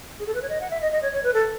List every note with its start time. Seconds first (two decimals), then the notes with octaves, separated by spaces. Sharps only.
0.20 G#4
0.26 A4
0.35 B4
0.42 C#5
0.49 D#5
0.61 F#5
0.70 E5
0.81 D#5
0.92 D#5
1.02 C#5
1.12 C#5
1.24 B4
1.34 A4